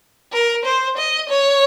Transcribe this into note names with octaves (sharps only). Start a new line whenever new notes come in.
A#4
C5
D#5
C#5